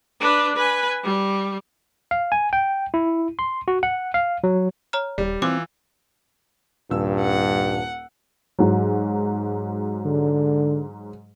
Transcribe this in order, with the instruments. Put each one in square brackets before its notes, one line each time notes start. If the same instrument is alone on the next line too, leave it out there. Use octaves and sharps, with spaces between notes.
[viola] D4 B4
B4 G#5
G3
[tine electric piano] F5
G#5
G5
E4
C6
F#4
F#5
F5
F#3
[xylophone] C#5 A#5 F6
[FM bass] D#1 [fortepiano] G3
[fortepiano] E3 F4 [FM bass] C4 [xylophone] D6
[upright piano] D#1 E6 [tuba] G2
[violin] F#5
[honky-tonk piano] G#2 F#3
[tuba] D3